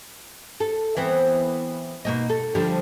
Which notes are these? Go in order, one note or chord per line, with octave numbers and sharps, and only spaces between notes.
A4
E3 B3 C4
B2 A#3 D#4
A4
D3 F3 G3